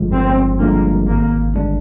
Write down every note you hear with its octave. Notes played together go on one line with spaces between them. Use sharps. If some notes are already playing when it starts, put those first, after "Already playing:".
Already playing: G1 G2 D3 F3 G#3
G1 C4
G2 D3 F3 G#3 A#3
G#1 A#3
G2 D3 G#3 D4